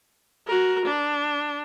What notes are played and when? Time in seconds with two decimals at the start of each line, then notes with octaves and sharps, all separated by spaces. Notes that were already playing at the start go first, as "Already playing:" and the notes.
0.47 F#4 A#4
0.85 D4